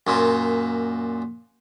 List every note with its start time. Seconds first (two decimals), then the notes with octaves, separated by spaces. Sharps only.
0.07 F#2 A#2